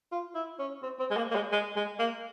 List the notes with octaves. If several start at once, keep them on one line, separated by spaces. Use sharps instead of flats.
F4
E4
C#4
C4
C4
G#3
A#3
A#3
G#3
G#3
G#3
A#3